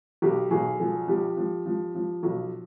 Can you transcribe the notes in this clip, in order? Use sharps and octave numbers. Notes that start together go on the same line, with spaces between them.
B1 G4
B1 G#4
F3 G#4
F3 G4
F3
F3
F3
B1